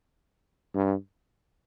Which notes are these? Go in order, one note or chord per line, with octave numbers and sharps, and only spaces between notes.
G2